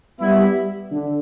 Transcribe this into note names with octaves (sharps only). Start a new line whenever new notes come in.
G3 B3 E4
D3